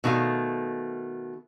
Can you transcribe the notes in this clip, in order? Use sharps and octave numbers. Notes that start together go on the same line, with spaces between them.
B2 D#3 A3 F5